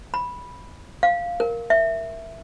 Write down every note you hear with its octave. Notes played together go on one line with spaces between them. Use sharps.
B5
F5
A#4
E5